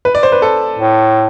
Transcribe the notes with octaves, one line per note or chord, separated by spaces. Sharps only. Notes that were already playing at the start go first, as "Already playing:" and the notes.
B4
D5
C5
B4
A4
A2